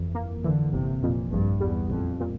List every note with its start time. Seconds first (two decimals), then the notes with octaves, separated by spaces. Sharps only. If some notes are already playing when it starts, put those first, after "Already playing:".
Already playing: G1 F2 E3
0.15 A#3
0.44 D3 E3
0.73 G1 C3
1.03 F2 A#2
1.32 A#1 G2
1.60 E2 G3
1.90 A#1 F2
2.20 A#2